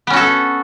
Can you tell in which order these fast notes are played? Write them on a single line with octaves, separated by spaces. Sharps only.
B3 C#4 F#4 A4